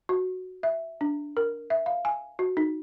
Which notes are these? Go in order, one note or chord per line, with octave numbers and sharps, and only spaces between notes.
F#4
E5
D4
A#4
E5
F5
G#5
F#4
D#4